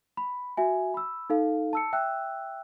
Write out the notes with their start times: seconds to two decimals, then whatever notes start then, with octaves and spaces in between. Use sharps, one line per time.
0.17 B5
0.57 F#4 E5 G#5
0.94 B5 E6
1.30 D#4 A4 F5
1.73 A5 E6 C#7
1.93 E5 G5 E6 F#6